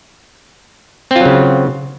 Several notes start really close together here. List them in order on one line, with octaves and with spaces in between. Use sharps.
C4 F4 F#3 C#3